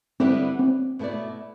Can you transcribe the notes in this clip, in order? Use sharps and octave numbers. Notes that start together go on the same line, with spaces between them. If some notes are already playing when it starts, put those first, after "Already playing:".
D3 G3 B3 C4 E4 B4
C4
B2 A3 E4 B4 D5